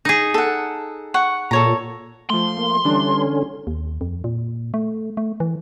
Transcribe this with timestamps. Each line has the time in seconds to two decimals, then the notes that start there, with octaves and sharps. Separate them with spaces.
0.05 D#4 G#4
0.34 A4 F#5
1.14 F#5 C#6
1.51 A#2 A4 C#5 A#5
2.30 F3 A3 C6
2.57 A#3
2.85 D3 E3 G3 C#4 D4
3.67 D#2
4.01 F2
4.24 A#2
4.74 A3
5.17 A3
5.40 E3